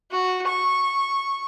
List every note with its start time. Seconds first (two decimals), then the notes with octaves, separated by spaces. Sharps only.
0.11 F#4
0.47 C#6